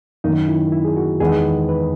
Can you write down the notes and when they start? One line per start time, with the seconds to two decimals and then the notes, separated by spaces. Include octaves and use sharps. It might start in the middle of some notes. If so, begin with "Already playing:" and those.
0.24 F#2 D#3 A#3 D#4
0.48 E4
0.72 E4
0.85 G#4
0.96 F#4
1.20 E2 D#3 G#3 B3 D#4 G#4
1.69 B4